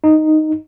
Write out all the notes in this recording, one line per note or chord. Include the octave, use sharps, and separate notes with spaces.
D#4